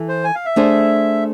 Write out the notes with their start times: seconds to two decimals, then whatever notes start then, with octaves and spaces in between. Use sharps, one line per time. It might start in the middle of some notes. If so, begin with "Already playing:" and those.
Already playing: E3 A4
0.08 C5
0.24 G#5
0.35 F5
0.45 E5
0.56 A3 D4 G#4 C5